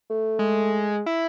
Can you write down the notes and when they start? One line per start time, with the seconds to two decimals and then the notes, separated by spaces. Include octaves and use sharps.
0.10 A3
0.39 G#3
1.06 E4